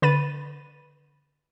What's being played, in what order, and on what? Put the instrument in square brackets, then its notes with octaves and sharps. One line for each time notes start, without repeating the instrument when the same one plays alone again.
[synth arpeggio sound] D3 B4 B5 A6 D#7